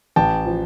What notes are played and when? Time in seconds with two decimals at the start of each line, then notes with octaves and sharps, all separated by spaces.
0.16 A1 G5 A5
0.46 F3